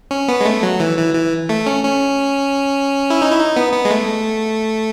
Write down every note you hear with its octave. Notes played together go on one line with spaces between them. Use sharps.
C#4
B3
G#3
A3
F#3
E3
E3
E3
A3
C#4
C#4
E4
D#4
E4
D#4
B3
B3
G#3
A3